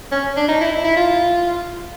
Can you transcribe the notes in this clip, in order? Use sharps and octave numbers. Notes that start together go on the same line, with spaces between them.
C#4
D4
D#4
E4
E4
E4
F4